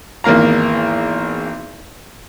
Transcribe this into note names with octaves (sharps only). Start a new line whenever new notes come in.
G#1 E2 A#3 F5 A#5